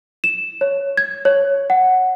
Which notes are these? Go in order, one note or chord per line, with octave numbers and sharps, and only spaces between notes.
E7
C#5
G#6
C#5
F#5